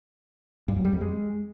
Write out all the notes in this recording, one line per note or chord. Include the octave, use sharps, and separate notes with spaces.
G2
F#2
G3
F2
G#3